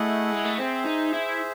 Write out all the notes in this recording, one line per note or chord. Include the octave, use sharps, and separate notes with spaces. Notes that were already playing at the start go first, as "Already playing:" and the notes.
Already playing: A3 E4 G#4 D#5 F#5
G#3
A3
C4 G#4 C5 E5
D#4
E4